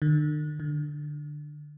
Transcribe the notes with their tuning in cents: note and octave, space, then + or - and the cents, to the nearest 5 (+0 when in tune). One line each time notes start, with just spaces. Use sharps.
D3 +45
D3 +10